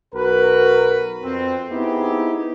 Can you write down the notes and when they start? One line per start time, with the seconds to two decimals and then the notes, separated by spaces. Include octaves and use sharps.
0.13 B1 F#4 A#4 B4
1.23 F2 C4
1.71 B3 C4 D#4 E4 G4 G#4